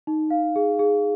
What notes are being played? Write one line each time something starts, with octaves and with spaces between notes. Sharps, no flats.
D#4
F5
G#4
G#4